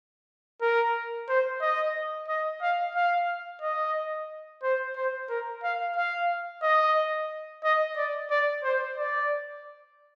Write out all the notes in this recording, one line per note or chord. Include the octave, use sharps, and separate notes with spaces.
A#4
C5
D#5
D#5
F5
F5
D#5
C5
C5
A#4
F5
F5
D#5
D#5
D5
D5
C5
D5